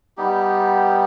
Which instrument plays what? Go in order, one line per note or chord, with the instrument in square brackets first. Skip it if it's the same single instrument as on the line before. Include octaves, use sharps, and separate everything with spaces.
[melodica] G3 B3 D#4 G4